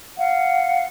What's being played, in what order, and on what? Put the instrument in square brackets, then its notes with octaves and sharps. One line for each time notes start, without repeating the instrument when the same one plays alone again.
[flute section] F5 F#5